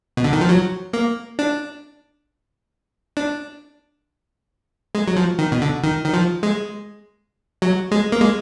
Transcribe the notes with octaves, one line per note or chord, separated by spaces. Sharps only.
B2
D3
D#3
F3
F#3
A#3
D4
D4
G#3
F#3
F3
D#3
B2
D3
D#3
D#3
F3
G#3
F#3
G#3
A#3
G#3